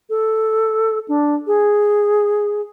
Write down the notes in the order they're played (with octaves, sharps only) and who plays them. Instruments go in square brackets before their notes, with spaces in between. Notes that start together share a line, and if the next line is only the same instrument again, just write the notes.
[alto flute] A4
D4
G#4